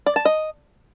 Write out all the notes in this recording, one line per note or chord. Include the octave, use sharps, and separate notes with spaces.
D5
A5
D#5